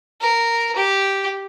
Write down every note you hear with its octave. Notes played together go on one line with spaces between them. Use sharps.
A#4
G4